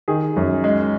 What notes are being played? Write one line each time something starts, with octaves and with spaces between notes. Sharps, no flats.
D#3 G#4
F#2
G#3